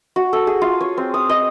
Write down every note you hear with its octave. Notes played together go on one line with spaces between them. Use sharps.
F#4
A4
G#4
F4
C#5
C4
D#6
D#5